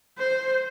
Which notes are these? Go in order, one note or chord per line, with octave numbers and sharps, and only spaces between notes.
C5